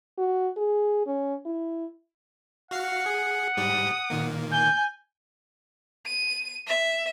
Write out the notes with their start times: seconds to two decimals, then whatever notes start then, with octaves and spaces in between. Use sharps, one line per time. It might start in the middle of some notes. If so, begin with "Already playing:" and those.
0.18 F#4
0.57 G#4
1.07 C#4
1.46 E4
2.71 F#4 F5 F#5 C7
3.06 G#4
3.57 G#2 G3 G4 D#6
4.10 A#2 D#3 A#3
4.52 G#5 G6
6.06 D#7
6.67 E5